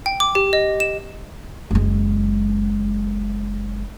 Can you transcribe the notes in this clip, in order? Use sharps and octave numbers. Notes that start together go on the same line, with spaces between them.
G5
D6
G4
D#5
E7
F#1 G#3